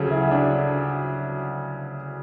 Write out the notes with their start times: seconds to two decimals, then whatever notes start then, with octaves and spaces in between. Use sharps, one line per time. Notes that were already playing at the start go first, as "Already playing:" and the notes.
Already playing: D2 C#3 F#3 G#4 A4
0.11 E4
0.31 D4